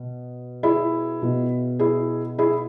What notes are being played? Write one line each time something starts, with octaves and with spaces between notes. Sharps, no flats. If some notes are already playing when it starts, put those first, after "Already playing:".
Already playing: B2
E4 G#4
B2
E4 G#4
E4 G#4